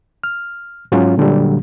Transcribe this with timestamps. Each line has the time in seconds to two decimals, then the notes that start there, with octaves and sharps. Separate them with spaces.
0.24 F6
0.92 G#2 F#3 C#4 F4
1.18 A#2 D3 F#3 G3